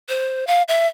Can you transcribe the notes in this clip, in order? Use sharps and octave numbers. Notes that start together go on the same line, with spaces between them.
C5
F5
E5